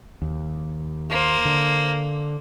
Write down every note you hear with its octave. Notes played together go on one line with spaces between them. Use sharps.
D#2
A#3 C5
D3